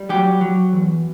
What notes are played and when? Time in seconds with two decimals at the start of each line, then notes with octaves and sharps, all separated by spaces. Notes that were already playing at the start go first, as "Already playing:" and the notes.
Already playing: G3
0.09 F#3 G4
0.41 F#3
0.73 E2